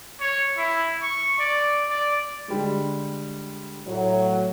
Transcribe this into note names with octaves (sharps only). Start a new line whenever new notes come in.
C#5
E4
C#6
D5
D5
D3 G3 G#3
A2 F#3